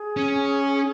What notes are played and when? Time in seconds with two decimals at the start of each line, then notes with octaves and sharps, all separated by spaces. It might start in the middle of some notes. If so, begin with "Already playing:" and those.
Already playing: G#4
0.17 C#4